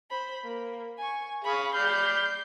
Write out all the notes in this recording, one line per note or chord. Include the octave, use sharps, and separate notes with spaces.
C5 B5
A#3
G#5 C#6
G#4 F5 B5 C#6
D5 B5 F6 G6 C7